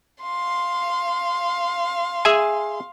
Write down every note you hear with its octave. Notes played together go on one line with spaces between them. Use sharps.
F5 C6
G#4 E5 G#5